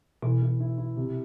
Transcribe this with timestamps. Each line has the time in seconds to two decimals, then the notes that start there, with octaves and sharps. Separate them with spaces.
0.22 B2 E3
0.42 E3
0.60 E4
0.78 E4
0.96 C3